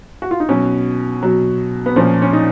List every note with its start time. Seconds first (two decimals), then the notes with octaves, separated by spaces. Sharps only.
0.22 F#4
0.31 F4
0.40 D#4
0.49 B2 F#3 C#4
1.23 B2 F#3
1.86 B3
1.96 A#2 F3 C#4
2.22 C#4
2.33 D#4